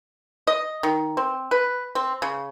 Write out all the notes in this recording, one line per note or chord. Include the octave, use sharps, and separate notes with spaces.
D#5
D#3
C4
B4
C4
C#3